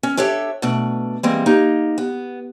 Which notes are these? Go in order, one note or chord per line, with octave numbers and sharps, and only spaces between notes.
C#4
D4 G4 A4 C#5 E5
B2 A3 D4
E3 G3 G#3 A#3 C4
A#3 D#4 G4
B3